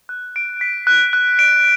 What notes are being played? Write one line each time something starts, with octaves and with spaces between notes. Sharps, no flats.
F#6
D7
B6
F#6
F#6
D7